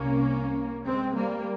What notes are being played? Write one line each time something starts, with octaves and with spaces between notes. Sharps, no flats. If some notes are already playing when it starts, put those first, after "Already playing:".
Already playing: C2 C3 A#3 C#4
G#3 C4
G3 A#3